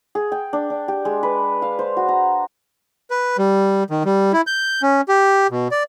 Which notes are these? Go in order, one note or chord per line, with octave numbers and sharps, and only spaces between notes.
G#4
G5
D4
D4
G4
G#3
B4
F5
C5
F#4
A#5
B4
G3
D#3
G3
E4
G6
C#4
G4
B2
D5